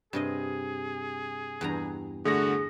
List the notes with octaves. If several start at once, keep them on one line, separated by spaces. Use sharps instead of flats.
G2 C3 G#4 D#5
E2 G2 A#5
D3 A3 F#4 G#4 A#6